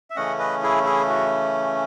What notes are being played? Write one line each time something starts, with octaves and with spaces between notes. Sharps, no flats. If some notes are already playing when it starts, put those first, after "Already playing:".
E5
C#3 E3 A3 C#4 D#5 F#5
B4 D#5
E4 G#4
E4 G#4
F#4